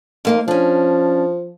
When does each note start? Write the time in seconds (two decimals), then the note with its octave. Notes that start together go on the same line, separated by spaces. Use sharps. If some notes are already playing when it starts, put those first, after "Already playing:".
0.25 F2 A#3 D#4
0.48 F3 C#4 D4